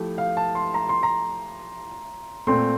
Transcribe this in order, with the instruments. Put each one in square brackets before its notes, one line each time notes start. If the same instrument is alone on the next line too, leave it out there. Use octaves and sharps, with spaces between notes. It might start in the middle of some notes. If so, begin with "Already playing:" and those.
Already playing: [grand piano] F3 A3 E4 G4
[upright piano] F5
A5
C6
A#5
C6
A#5
[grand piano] A#2 A3 C4 [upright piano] C6